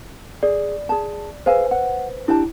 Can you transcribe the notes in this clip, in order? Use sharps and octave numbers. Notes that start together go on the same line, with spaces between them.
G#4 D5
G#4 A5
G#4 B4 C5 F5 G#5
F#5
D4 E4 G4 A5